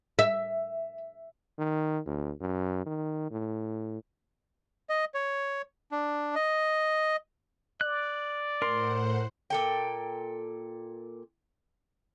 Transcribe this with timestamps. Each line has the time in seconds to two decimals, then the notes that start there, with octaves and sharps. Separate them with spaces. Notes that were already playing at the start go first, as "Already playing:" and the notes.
0.19 E5
1.59 D#3
2.06 D2
2.41 F#2
2.86 D#3
3.31 A2
4.90 D#5
5.14 C#5
5.92 D4
6.35 D#5
7.81 D5 F#6
8.62 A2 A#4 C5 F#5 C6
9.50 A#2 A4 G5